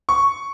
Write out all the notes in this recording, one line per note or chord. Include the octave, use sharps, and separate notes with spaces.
C#6